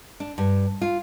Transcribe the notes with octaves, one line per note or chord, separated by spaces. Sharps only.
D4
G2
F4